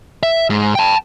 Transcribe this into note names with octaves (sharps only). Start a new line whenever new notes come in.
E5
G#2
G5 A5